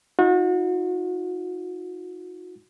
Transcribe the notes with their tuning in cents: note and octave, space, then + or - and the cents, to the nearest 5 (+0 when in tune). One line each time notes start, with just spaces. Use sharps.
D#4 +35 F#4 -35